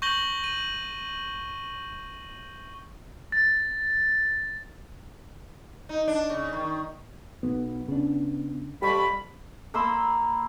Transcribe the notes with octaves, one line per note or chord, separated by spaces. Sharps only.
C#6 G6 A#6 F#7 G7
D#7
A6
D#4
D4
C#3
D#3
B1 B3
C#3 D4
F2 G3 G4 B5 C#6
A#3 B5 C6 E6